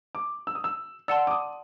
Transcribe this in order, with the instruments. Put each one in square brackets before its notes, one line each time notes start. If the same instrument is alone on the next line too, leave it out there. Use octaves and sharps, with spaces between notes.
[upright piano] D6
E6
D#6
E6
[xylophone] D5 F#5 A5 C6 [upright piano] E6
[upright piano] D6
D#6